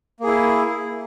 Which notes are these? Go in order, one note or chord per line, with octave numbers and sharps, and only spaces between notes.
A#3 E4 G#4